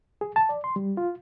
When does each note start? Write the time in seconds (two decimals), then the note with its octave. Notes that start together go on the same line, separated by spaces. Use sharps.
0.21 G#4
0.36 A5
0.49 D5
0.64 C6
0.76 G3
0.97 F4